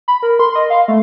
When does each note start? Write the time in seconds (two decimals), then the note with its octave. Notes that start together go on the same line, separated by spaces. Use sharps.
0.08 B5
0.23 A#4
0.39 C6
0.55 D#5
0.70 F5
0.88 A3